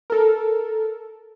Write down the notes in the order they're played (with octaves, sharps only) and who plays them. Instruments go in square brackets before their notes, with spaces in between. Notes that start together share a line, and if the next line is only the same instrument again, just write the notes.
[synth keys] A4 A#4